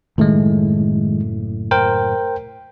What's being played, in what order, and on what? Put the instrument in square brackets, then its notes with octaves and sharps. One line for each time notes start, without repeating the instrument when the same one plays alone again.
[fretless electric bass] F#1 A2 A3 [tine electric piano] D#3 G#3
[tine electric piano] A#4 C5 G5